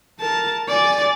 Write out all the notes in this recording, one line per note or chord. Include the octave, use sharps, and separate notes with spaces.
A#4 A5
D5 G#5